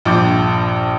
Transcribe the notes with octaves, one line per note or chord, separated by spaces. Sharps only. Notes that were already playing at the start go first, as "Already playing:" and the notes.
A#1 G2 F3 D6 G6 A6